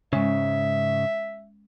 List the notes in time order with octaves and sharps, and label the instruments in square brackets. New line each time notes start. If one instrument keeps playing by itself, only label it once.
[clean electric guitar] G#2 C#3 [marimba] G#3 C#4 [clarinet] E5